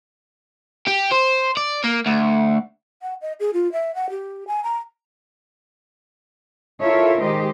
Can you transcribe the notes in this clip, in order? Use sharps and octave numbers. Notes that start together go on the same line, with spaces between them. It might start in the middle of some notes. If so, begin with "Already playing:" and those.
G4
C5
D5
A#3
D2
F#5
D#5
G#4
F4
E5
F#5
G4
G#5
A#5
E4 F4 A4 A#4 C#5 E5
D#3 G#3 G4 C5 D#5